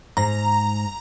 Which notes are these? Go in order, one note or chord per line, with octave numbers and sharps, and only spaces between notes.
G#2 A#5